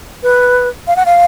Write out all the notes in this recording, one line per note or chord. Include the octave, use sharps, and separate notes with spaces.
B4
F5
F#5
F5